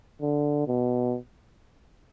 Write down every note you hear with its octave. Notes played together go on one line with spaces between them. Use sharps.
D3
B2